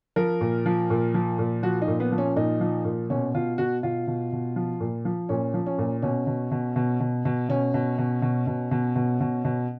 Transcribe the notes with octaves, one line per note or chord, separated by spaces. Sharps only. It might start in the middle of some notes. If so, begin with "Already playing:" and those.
F3 A#4
A#2
F3
A#2
F3
A#2
F3 F#4
D#4
A#2
B3
F3
C#4
A#2 D#4
F3
A#2
B2 C#4
B2 F4
B2 F#4
B2 F4
B2
B2
F3
A#2
F3
A#2 C#4
F3
C#4
A#2
B2 C#4
B2
B2
B2
B2
B2
B2 C#4
B2
B2
B2
B2
B2
B2
B2
B2